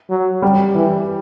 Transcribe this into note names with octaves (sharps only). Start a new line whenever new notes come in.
F#3
G3
E3